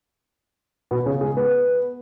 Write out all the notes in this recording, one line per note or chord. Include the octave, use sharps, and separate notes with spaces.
B2 B3
C#3 C#4
G#3 G#4
B3 B4